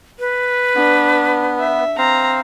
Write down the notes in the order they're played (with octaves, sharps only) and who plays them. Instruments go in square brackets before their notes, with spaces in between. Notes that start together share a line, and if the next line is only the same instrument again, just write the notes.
[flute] B4
[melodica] B3 [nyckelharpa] D4
[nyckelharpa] E5
[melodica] C4 F5 [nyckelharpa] A#5